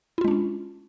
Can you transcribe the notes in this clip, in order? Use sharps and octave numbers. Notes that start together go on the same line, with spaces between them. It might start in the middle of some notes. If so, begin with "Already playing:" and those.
G#3 C#4 D4 E4 F4